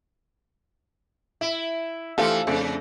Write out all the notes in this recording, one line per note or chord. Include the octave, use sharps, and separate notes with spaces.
E4 E5
D3 E3 F3 A3 G4 A4 F5
F2 C#3 A3 D4